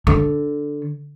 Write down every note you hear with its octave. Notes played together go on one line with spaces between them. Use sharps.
D3